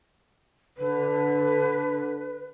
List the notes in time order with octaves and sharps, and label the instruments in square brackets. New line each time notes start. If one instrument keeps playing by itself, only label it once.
[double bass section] D3 [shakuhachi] B4